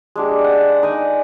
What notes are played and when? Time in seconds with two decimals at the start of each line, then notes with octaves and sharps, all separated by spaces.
0.16 G#3 D4 G4
0.44 F#5
0.83 D#4 D5 G#5 D#6